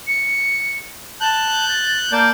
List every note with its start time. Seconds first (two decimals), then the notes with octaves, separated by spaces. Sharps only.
0.07 C#7
1.20 A5 F#6 G6
1.69 A6
2.12 A#3 D5 A5 G6